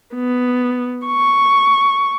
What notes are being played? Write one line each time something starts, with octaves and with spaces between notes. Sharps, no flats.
B3
C#6